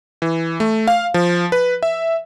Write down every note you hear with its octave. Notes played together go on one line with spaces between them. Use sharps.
E3
A3
F5
F3
B4
E5